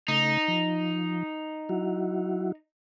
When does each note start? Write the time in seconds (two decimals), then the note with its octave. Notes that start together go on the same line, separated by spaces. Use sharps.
0.08 C#3 A3 D#4
0.48 F3
1.69 F#3 E4 F#4